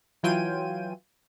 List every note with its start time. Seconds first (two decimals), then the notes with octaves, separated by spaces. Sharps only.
0.23 E3 F#3 F4 G5 G#5 D#7